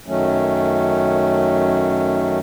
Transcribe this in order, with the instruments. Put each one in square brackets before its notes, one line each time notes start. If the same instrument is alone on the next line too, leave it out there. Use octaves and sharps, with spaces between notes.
[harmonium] F#2 D#3 F#3 A3 C#4